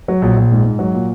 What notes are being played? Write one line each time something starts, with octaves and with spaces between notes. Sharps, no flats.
F#3
A#1
A#1
G#2
G#2
F#3
A#2